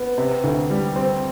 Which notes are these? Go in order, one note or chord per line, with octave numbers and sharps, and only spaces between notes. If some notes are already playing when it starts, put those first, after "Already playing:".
Already playing: B3
C3
D2
G3
C4